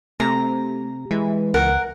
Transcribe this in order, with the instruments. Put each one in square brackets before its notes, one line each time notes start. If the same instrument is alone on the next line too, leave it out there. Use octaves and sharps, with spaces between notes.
[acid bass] C3 [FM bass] A3 [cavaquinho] A#5
[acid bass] E3 [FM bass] G#3
[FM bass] C#2 [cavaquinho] A#4 F#5